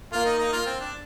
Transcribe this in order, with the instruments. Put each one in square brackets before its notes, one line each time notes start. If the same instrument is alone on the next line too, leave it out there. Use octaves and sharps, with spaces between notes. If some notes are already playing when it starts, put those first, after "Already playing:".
[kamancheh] A#3 [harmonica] F4
[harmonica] D#4
D#4
F4
C4
D4